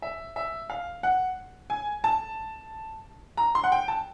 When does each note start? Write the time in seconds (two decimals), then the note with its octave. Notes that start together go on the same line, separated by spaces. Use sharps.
0.02 E5
0.36 E5
0.70 F5
1.03 F#5
1.70 G#5
2.04 A5
3.37 A#5
3.55 C6
3.64 F#5
3.72 G5
3.88 A5